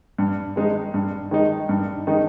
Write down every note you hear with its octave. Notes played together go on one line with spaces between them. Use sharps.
G2
D#3 G#3 D#4
G2
D#3 G#3 D#4
G2
D#3 G#3 D#4